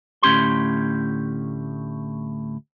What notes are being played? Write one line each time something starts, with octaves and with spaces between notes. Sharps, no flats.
D2 A2 C#4 G4 C6